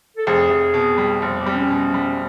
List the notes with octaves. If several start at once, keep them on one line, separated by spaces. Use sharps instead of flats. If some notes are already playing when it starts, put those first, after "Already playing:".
A4
F1 G#4
F1
B2
G3
F1
G4
G3 C4
C#4
B2
G3